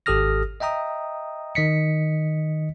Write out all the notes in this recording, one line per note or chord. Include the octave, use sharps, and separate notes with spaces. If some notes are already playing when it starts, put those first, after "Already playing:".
G#1 G4 A4 D#6 F6 A#6
D#5 E5 G5 A#5 D#6
D#3 D#5 B6 C#7